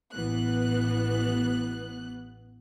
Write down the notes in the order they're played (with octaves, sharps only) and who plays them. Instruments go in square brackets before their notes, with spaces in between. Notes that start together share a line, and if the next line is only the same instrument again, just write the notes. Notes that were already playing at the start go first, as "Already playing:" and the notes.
[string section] A1 E3 B3 F#6